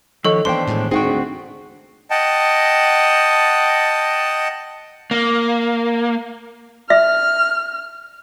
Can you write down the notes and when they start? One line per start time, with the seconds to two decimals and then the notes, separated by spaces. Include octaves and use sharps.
0.25 D#3 F3 A4 C#5 D#5
0.45 E2 E3 A#3 D4 C5 G5 C6
0.67 A2 D#3 G#3
0.91 G#2 C4 F#4 G#4 F#5 G5
1.05 D2
2.11 D#5 F#5 G5 A5
5.11 A#3
6.90 E5 F6